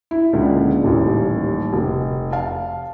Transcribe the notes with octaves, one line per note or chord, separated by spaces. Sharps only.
E4
C#2 A#2 D3
D#1 A1 D#2
F1
F5 A5